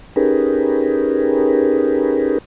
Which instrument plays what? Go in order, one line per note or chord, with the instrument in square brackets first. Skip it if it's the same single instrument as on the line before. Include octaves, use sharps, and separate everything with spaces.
[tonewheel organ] C#4 D#4 G4 G#4 A#4 B4